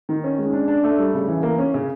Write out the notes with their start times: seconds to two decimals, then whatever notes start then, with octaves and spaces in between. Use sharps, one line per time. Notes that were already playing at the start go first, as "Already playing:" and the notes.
0.09 D#3
0.24 C#4
0.38 G#3
0.53 D4
0.68 D4
0.84 A3
0.99 G3
1.14 C#3
1.28 E3
1.43 A#3
1.59 C#4
1.74 C#3